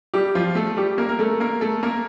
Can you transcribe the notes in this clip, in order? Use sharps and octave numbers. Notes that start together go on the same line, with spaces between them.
G3 G4
F3 F4
A3 A4
G3 G4
A#3 A#4
A#4
A3 A4
A#3 A#4
A3 A4
A#3 A#4